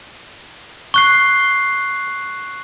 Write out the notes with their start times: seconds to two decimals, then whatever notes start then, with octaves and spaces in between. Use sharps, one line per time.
0.94 C#6 F#6 C7